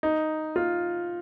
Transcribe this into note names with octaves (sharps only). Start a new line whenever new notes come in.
D#4
F4